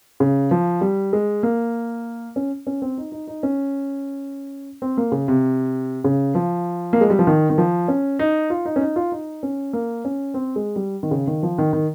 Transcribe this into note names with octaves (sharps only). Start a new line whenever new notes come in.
C#3
F3
G3
G#3
A#3
C#4
C#4
C4
D#4
D#4
D#4
C#4
C4
A#3
C#3
C3
C#3
F3
A#3
G#3
G3
F3
D#3
D#3
F3
C#4
D#4
F4
D#4
C#4
D#4
F4
D#4
C#4
A#3
C#4
C4
G#3
G3
D#3
C#3
D#3
F3
D#3
D#3